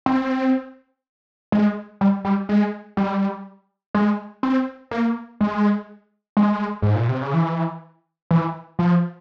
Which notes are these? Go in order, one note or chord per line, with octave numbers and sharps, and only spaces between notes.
C4
G#3
G3
G3
G#3
G3
G#3
C4
A#3
G#3
G#3
G#2
A#2
C3
C#3
E3
E3
F3